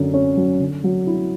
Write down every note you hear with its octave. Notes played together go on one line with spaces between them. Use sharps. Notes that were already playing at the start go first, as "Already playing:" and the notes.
Already playing: F#2 D3
C#4
F#3
D3
F#3
E4